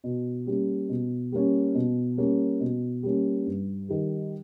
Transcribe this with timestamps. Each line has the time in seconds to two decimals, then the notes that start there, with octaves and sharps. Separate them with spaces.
0.04 B2
0.46 G3 A#3 C#4
0.89 B2
1.32 G3 A#3 C#4
1.75 B2
2.17 G3 A#3 C#4
2.60 B2
3.03 G3 A#3 C#4
3.46 G2
3.89 D#3 G3